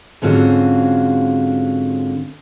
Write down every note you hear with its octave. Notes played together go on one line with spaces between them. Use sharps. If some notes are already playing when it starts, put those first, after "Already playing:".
G#2 D3 C4 C#4 F4 F#4